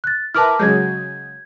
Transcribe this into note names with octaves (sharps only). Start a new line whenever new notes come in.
F#6 A6
E4 A#4 B4 A5 D6 F6
C#3 F#3 G#3 G6 G#6